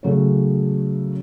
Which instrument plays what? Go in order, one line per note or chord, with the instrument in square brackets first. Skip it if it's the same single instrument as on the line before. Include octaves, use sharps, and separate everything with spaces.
[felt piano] C#3 F#3 A3 C#4